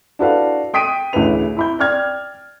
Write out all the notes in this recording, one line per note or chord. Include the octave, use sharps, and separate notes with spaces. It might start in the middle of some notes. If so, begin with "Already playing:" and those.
D4 E4 F#4 A4 B4 F5
G5 D#6 B6 D7 D#7
A1 D2 C#3 E4 B4 F7
E4 B5 G6
D5 G5 F6 G#6